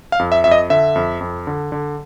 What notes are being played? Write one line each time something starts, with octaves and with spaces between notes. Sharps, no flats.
F5
F2
E5
F2 E5
D#5
D3 E5
F2
F2
D3
D3